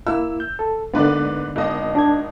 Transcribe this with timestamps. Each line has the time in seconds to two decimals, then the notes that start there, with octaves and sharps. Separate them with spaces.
0.07 A#3 E4 E6
0.40 G6
0.59 A4
0.94 G#2 D3 A#3 B3 B4 D5
1.56 G#1 D#5
1.95 D4 G#6